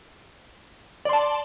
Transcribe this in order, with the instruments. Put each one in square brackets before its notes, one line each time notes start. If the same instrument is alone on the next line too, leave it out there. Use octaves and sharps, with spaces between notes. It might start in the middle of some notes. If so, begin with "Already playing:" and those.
[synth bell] D5
C6
A5